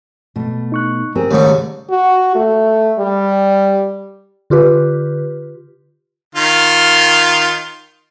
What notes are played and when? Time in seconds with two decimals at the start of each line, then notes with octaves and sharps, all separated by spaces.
0.36 B2 A3
0.72 D#4 C#6 F#6
1.15 C4 G4 G#4 A#4
1.31 D#2 G#2 C#3 G3 A3 C#6
1.90 F#4
2.35 A3
2.99 G3
4.50 D3 F4 G4 B4
6.35 D#3 F4